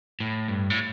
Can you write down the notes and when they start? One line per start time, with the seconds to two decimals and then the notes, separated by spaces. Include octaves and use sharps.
0.20 A2
0.48 G2
0.70 A2